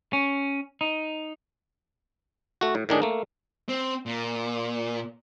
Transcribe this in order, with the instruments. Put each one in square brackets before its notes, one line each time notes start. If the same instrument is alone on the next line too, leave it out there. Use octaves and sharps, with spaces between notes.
[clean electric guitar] C#4
D#4
[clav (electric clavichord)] A3 F#4
A2
A2 D#3 D4 G#4
A3 A#3
[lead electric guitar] C4
A#2